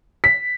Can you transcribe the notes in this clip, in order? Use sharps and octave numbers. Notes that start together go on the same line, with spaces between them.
B6